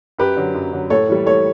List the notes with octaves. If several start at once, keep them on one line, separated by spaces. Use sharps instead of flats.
F#2 G4 B4
D3 F#3
F#2
D3 F#3
A2 A4 C#5
E3 G3
A2 A4 C#5